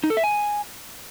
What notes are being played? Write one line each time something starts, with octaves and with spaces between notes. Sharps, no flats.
D#4
A4
E5
G#5